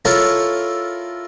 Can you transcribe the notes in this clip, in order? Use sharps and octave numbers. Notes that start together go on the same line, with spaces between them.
E4 F4 A4 A#4 C#5